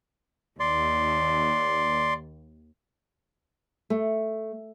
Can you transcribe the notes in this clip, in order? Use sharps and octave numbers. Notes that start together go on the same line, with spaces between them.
D#2 D5 C6
A3